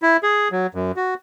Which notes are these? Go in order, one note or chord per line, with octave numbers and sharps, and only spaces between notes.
E4
G#4
F#3
F#2
F#4